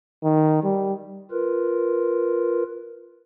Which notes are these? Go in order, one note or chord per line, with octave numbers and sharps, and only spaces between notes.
D#3
G3
F4 A#4 B4